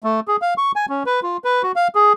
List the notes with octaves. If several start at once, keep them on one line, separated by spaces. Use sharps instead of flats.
A3
G#4
F5
C#6
G#5
C#4
B4
F4
B4
F#4
F5
G#4